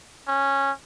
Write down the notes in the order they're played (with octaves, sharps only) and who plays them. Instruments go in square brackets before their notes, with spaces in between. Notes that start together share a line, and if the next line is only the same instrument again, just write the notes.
[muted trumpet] C#4